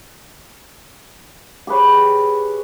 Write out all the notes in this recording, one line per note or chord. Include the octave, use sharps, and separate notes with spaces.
G4 G#4 B4 C#5